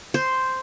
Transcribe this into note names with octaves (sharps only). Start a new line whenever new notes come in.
C5